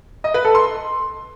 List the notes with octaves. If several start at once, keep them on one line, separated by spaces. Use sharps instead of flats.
D#5
B4
A4
C6